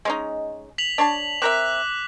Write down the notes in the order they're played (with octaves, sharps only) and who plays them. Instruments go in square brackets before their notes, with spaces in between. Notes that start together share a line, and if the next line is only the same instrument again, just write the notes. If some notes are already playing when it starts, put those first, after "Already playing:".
[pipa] G#3 C#4 D#4
[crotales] B6 F7 F#7
[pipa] D4 C#5 A5
[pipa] C4 A#4 E5 [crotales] D6 F#6 B6